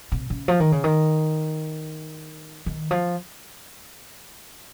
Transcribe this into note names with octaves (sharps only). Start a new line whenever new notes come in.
C3
C#3
F3
D#3
C#3
D#3
D#3
F3